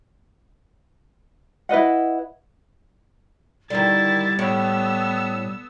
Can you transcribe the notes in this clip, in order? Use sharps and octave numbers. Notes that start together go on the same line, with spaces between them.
E4 B4 D#5 F#5
D3 D#3 G3 E4 A6
A2 B3 E6